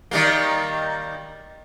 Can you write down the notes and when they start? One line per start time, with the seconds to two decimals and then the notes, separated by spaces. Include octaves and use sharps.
0.11 D#3 G3 A#3